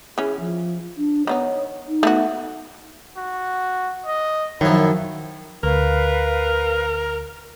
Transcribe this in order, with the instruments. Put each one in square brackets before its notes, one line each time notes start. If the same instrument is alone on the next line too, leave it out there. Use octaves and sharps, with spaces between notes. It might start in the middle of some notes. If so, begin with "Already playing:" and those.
[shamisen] E3 C#4 [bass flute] G#4
[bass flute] F3
D4
[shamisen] D#3 B3 D#4 [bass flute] C#5
[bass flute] D#4
[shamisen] A3 B3 F#4
[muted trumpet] F#4
D#5
[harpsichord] F#2 F3 [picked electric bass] D#3 [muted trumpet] E4
[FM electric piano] D2 [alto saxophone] A#4 [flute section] B4 F5